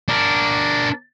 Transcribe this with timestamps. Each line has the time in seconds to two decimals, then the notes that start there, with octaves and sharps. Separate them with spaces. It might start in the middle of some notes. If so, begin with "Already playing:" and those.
0.08 D4 A#4